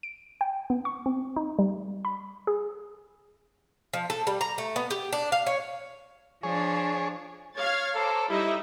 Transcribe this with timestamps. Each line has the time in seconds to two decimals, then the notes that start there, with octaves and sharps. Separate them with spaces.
0.03 D7
0.41 G5
0.70 B3
0.85 C#6
1.06 C4
1.36 D#4
1.59 G3
2.05 B5
2.47 G#4
3.93 F3
4.10 A4
4.27 G3
4.41 A#5
4.58 A3
4.76 B3
4.90 G4
5.13 D4
5.32 F5
5.46 C#5
6.43 F3 D4 G#4 C#5
7.56 C#5 F5 F6 G#6 A6
7.95 A4 C5 A#5 D6
8.29 G3 D#4 E4 D#5 E5